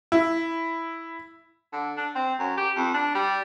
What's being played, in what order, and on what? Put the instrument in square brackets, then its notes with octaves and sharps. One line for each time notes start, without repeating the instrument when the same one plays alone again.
[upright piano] E4
[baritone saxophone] D3
D4
C4
F#2
G4
F2
D4
G3